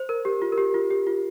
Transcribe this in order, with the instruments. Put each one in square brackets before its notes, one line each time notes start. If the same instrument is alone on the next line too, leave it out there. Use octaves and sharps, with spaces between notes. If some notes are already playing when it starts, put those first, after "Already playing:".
Already playing: [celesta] C5
A#4
G4
F4
A#4
G4
F4
G4
F4